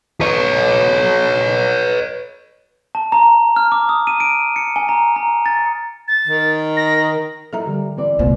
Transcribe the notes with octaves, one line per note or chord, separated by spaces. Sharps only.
B4 C#5
A5
A#5
F6
D6
D#6
D#7
D7
C#7
G#5
A#5
A#5
A6
A6
D#3
A#6
F3 D#4 E4 A4 E5 A#5
D3 G3
E3 C4 D5
C2 A#2 A3 B3 C5